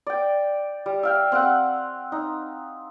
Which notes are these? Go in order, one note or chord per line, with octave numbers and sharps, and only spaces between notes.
D5 G5
G3
E5 F5 G5
C4 F5 F#5
D#4